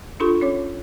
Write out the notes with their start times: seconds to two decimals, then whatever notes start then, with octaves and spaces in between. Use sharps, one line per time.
0.20 D4 F4 G4 A4 B5 C#6
0.41 C#4 C#5 D6